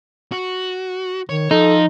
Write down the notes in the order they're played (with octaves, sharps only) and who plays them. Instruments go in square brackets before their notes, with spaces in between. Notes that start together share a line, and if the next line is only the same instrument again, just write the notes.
[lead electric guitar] F#4
[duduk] D#3 [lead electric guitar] C#5
[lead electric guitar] F3 [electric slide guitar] D#4 [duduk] A4